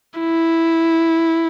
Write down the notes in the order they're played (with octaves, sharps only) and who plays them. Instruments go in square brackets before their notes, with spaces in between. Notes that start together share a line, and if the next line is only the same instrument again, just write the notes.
[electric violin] E4